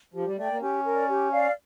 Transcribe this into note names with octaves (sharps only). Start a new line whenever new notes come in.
F3 G4
G3
A3 D5 G5
A#3
C#4 G4
A#4
D5
G4
D5 F5